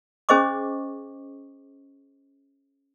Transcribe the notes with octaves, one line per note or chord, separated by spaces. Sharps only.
C#4 G#4 C5 D#5 C#6 D6